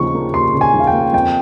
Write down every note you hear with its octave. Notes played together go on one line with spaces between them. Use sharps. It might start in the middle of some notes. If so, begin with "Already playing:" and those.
Already playing: D#2 C#3 F3 C#6
A#3
D#2 C6
C#3
G#5
F3
F5
G5
A#3
F2 G5